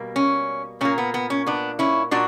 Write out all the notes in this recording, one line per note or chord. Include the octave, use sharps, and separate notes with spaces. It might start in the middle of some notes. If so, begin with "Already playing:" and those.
Already playing: B2 G3 A#3
C#4
A#2 A#3 C#4
B3
B3
C#4
B3 D4
C#4 E4
A#2 D4 F#4